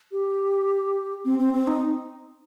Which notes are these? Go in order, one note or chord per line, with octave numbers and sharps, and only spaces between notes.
G4
C4
C4
C4
D#4